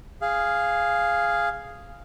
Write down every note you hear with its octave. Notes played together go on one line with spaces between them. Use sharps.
G#4 F5